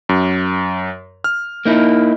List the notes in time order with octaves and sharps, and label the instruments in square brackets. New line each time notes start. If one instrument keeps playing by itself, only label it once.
[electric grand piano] F#2
F6
[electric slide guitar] A#3 D#4 E4